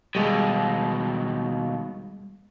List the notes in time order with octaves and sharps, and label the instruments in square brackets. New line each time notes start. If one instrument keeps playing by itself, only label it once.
[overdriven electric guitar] D#2 B2 [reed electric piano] G3 G#3